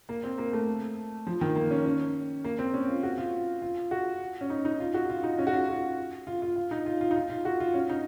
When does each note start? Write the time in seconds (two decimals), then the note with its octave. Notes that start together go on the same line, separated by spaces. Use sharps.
0.09 A#3
0.23 C4
0.38 A#3
0.53 A3
1.27 F3
1.41 D#3
1.56 A#3
1.70 C#4
1.86 C#4
2.44 A#3
2.59 C4
2.74 C#4
2.88 F4
3.03 F#4
3.18 F4
3.62 F4
3.91 F#4
4.41 C#4
4.50 D#4
4.65 D#4
4.80 F4
4.94 F#4
5.10 F4
5.24 D#4
5.38 C#4
5.47 F#4
5.53 F4
5.69 F#4
6.27 F4
6.42 F4
6.56 F4
6.71 D#4
6.86 F4
7.01 F4
7.11 D#4
7.16 F4
7.30 F4
7.45 F#4
7.60 F4
7.74 C#4
7.89 D#4